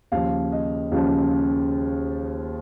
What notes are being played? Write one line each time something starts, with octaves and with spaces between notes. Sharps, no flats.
D#2 C#3 F3 F5
D#5
D#2 C#3 F3 F4